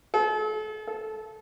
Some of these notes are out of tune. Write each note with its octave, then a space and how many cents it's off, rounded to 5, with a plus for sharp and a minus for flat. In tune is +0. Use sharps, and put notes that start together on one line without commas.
A4 -40
A4 -20